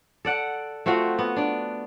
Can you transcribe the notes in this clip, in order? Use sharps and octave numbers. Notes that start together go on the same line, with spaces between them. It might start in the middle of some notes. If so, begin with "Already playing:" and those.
A4 D5 F#5
A3 C4 F4 F#4
B3
D4 D5